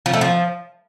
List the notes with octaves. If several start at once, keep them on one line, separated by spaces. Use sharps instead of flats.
F3
A3
F3